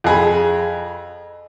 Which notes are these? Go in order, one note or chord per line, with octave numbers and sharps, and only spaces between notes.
F2 G#4 B5